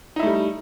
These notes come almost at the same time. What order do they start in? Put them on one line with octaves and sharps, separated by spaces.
D#4 E4 A3 G3